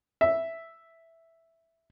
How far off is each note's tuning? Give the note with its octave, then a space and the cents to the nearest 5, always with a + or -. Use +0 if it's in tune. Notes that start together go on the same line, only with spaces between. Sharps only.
E5 +0